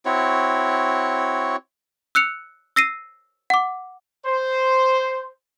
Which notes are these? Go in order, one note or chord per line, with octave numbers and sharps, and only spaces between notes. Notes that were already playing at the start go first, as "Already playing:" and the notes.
C4 E4 F#4 C#5
E6 F#6 C#7 F7
E6 A#6 C7 D#7
F#5 D6
C5